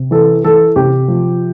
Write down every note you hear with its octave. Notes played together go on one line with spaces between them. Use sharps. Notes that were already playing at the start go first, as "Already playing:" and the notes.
Already playing: C3
E3 A4
E3 A4
C3 G4
F3